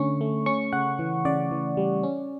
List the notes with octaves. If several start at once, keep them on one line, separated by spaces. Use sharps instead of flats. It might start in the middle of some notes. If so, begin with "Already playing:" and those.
Already playing: D3 A3 C#4 C#6
A3
C#4 C#6
C#3 F#5
E3
C#3 D5
E3
G3
C#4